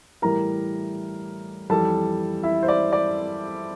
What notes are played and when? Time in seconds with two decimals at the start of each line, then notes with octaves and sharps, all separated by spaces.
0.22 A2 E3 G3 A#4 A#5
1.70 F2 E3 G3 A4 A5
2.43 E4 E5
2.63 C5
2.68 D5
2.93 D5